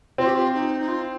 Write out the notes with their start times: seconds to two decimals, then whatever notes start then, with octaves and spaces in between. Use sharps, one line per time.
0.18 C4 F4
0.26 G4
0.35 F4
0.54 D#4
0.80 D#4
0.88 F4